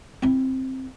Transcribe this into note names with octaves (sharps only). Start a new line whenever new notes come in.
C4 E4